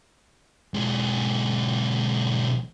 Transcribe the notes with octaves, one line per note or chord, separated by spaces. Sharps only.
B1 G#3